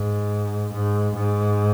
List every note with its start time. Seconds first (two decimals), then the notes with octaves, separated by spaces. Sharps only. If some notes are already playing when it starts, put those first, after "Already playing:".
Already playing: G#2
0.73 G#2
1.15 G#2